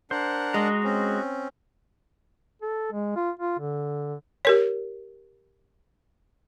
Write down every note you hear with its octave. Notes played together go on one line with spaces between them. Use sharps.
D4 A#4 C5 F#5
G#3 F#4 D#5 A#5
C4 C#4
A4
G#3
F4
F4
D3
G4 A#4 C#5